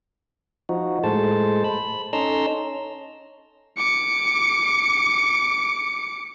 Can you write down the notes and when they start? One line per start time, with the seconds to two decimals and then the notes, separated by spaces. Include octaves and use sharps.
0.69 F3 D#4 F#4
1.04 A2 G#3 A4 C5 A5
1.64 B5
2.13 C#4 D#4 A4 A#5 C6 E6
3.78 D6 C#7